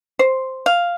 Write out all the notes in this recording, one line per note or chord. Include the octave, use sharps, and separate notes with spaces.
C5
F5